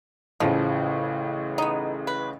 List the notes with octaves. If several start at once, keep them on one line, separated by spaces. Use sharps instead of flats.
A1 A2 C#3 F3
B3 D#4
B4